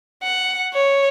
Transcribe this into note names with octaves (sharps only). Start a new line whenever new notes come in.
F#5
C#5